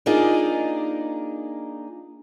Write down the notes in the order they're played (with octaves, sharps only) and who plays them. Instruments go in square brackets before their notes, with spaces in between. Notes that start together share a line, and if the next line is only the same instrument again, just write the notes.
[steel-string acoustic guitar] A#3 D4 D#4 F4 G#4